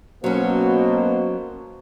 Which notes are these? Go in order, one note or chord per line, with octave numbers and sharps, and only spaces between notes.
B2 F#3 A#3 C#4 C5